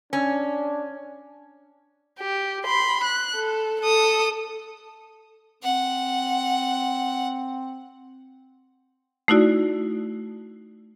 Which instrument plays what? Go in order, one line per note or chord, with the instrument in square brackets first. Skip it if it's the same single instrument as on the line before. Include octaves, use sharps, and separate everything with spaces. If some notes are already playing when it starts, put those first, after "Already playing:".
[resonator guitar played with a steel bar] C#4 [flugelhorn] D4
[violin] G4
B5 C6
F#6
A4
A4 D#6
[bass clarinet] C4 [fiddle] F#5
[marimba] A3 D#4 E4 F#4 D5